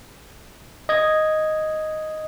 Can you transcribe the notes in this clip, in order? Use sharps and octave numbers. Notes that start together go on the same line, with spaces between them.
D#5 G#6